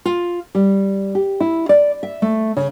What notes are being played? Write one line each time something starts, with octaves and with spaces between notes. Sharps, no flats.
F4
G3
G4
E4
D5
E5
A3
C#3